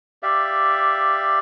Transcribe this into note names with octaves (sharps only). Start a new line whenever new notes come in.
G4 D5 E5 F5